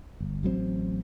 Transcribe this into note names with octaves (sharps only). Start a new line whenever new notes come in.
G1
A1 F#3 G3 C4